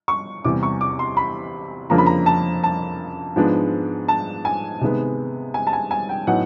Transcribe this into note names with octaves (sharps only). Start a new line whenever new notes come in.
C#6
E2 C3 E3 G3 D6
C#6
D6
C6
B5
F2 C#3 F3 A#3 D4 A#5
B5
A#5
A5
A5
G#2 F3 G#3 B3 D4
A5
G#5
C3 D#3 G#3 B3
G#5
A5
G#5
G#5
G5
A2 F#3 B3 D#4 F#5